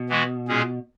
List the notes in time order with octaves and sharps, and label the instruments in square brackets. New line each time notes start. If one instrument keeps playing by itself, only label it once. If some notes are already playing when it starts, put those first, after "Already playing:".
Already playing: [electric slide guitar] B2
[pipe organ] E3 G#3 B3 F#4
A#2 G#3 C#4 G#4